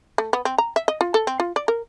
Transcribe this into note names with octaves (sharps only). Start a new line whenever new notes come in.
A3
B3
C4
A#5
E5
D#5
F4
A4
C4
F4
D5
A#4